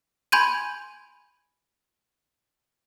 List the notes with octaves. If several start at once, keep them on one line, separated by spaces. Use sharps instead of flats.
G#5 B5 C6 G6 G#6 D#7